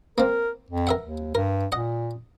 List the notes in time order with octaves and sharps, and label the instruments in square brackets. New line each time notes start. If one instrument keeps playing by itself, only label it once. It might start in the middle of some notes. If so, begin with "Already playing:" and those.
[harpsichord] A#3 C4 [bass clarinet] A#4
[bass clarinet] F2
[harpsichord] A#4 E5 F#5
[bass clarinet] D#2
[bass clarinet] G2 [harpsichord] A#4
[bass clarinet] A#2 [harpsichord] D#5 F#5